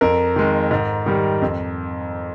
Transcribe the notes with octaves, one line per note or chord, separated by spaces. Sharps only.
F2 A#4
D#3 G#3
G#2
D#3 G3
F2